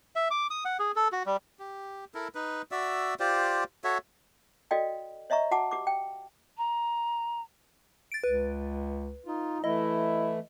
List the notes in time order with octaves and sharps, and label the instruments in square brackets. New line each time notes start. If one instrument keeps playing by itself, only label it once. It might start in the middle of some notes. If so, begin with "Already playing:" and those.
[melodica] E5
D6
D#6
F#5
G#4
A4
F#4
G3
G4
E4 A4 A#4
D#4 B4
F#4 D5 E5 E6
F4 G4 C5 D5
F#4 A4 C#5 E5
[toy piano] F#4 A4 D5 D#5 F5 G5
C#5 D#5 E5 A#5 C#6
F#4 F#5 A5 D6
G4 D6
G5
[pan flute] A#5
[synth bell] A6 D7
[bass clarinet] C#2 [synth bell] B4
[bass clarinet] D#4 [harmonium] F4
[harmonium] E3 A3 [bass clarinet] E4 [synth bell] D#5